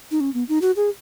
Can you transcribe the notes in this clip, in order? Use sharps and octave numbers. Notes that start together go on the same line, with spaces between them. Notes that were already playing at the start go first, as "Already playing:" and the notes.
D#4
C#4
B3
D#4
F#4
G#4